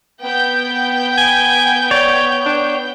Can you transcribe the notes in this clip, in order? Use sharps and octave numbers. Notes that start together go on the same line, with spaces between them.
B3 G5 G6
G#5
C#5 D5
D4